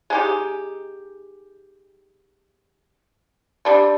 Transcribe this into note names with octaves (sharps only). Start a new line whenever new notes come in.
G#3 D#4 G4
D3 G3 D4